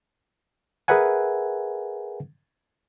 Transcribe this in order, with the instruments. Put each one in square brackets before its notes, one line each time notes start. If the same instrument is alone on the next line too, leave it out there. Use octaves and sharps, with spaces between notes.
[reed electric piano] G#4 A#4 B4 E5 F#5 G#5